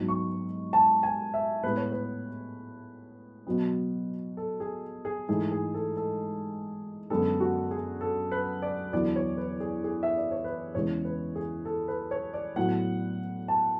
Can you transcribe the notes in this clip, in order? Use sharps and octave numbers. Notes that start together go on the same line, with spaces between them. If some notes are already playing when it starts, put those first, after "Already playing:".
Already playing: G#2 F#3 B3
C#6
A5
G#5
E5
A2 G#3 B3 B4
C#5
B4
B2 F#3 B3
A4
G#4
G#4
G#2 E3 A3 G#4
G#4
A4
A4
F#2 D3 G#3 B3 A4
F#4
G#4
A4
B4
D5
E2 D3 F#3 B3 D5
C#5
B4
G#4
G#4
E5
D5
C#5
B4
E2 C#3 E3 G#3 B3 C#5
B4
G#4
A4
B4
C#5
D5
A2 F#3 B3 F#5
A5